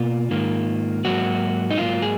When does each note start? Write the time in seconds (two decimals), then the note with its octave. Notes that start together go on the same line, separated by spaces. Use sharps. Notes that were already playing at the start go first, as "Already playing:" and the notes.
Already playing: B2 A#3 F4
0.31 G#2 D#3 A#3
1.05 G#2 F#3 A#3 F#4
1.71 D#4
1.78 G#2 F#3 A#3 F4
2.02 G#4